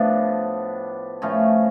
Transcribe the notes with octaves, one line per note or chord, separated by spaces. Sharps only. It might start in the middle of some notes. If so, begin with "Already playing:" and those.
Already playing: A2 F3 B3 D4
A2 F3 A3 C#4